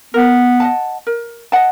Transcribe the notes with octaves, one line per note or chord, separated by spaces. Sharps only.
B3 A#4
D#5 F#5 A5
A#4
D#5 F#5 A5